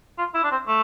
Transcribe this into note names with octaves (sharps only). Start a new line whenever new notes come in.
F4
E4
D4
C4
A3